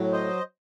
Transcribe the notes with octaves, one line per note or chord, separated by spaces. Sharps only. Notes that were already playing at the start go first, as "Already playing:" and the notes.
Already playing: A2 F#3
C5 D#5